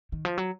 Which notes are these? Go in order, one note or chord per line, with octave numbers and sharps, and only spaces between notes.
D#3
F3
F#3